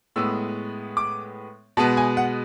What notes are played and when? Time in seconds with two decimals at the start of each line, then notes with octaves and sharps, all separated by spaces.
0.16 A2 G#3 B3 E6
0.97 D6
1.77 B2 G#3 B3 A5
1.97 G#5
2.17 F#5